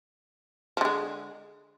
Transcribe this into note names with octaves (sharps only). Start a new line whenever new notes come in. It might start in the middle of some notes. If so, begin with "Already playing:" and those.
D3 F3 G#3